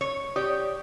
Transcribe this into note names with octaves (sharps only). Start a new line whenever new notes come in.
C#5
G4 C#5 D5 D#6